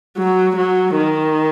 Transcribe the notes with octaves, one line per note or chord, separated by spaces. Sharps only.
F#3
F#3
D#3